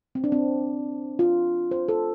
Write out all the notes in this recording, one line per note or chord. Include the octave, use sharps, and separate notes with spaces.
C4
D4
C4
F4
C5
A4